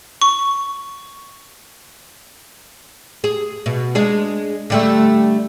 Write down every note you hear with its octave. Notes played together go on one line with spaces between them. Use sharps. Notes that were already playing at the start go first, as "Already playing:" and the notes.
C#6
G#4
B2
G#3 D4 G#4
D3 G3 A3